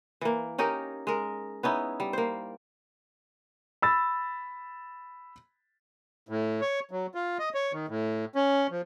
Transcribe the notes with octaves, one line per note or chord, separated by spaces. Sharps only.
E3 A#3
C#4 D#4 G4 A#4
G#3 A#4
B3 C#4 D#4 E4
G3
A#3 C5
B5 E6 A6
A2
C#5
F#3
F4
D#5
C#5
D#3
A2
C#4
F3